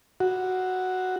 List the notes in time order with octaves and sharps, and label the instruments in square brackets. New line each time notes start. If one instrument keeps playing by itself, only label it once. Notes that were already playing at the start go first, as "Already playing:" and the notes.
[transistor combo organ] F#4